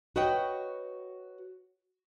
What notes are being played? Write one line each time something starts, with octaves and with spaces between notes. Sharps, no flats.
F#4 B4 C#5 D#5 F#5 G5